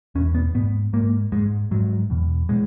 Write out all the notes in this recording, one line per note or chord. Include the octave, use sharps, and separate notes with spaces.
E2 B2 C#4
B3
G#2 B3
G#2 A#3
G#2 G#3
G#2 F#3
E2 B2
B2 G#3